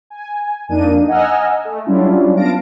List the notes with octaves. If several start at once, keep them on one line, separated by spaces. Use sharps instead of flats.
G#5
F2 A#3 D4 D#4 D#7
D#5 F#5 G#5 A#5 E6 F6
A3
F#3 G3 C#4 D4 E4 F4
B3 F5 A5 A#6 D7